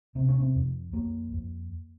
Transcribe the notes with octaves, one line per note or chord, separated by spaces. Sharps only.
C3 C4
C#4
C4
F2
F2 A#3
F2